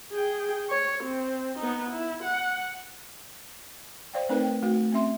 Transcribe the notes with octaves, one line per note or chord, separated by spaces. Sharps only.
G#4 G5
C#5
C4
B3 D#4
E4
F#5
C5 D5 F5 G5
A3 C4 D#4 A#4 B4
G5
A3 F#4
C4 C#4 E5 C6